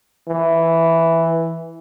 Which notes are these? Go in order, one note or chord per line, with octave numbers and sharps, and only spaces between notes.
E3